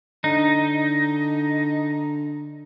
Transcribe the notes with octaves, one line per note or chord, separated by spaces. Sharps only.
D3 D#4